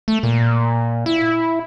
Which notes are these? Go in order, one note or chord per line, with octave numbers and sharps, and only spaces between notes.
A3
A#2
E4